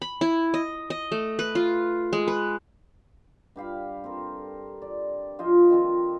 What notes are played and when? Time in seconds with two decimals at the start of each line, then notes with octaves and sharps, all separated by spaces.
0.02 B5
0.21 E4
0.54 D#5
0.90 D#5
1.12 A3
1.39 B4
1.55 F4
2.13 G#3
2.28 B4
3.56 G2 G4 F5 B5
4.04 C4 A4 A#4
4.82 D5
5.39 F3 F4 C5 D#5
5.70 D#3 C4 F4